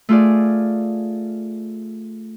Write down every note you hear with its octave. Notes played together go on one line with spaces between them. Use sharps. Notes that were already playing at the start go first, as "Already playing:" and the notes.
A3 F4 G#4 D5